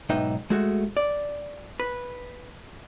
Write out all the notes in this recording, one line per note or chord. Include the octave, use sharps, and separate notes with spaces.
B1 G#2 D#4 B4 E5 G5
G#3 A3 F#4
D5
B4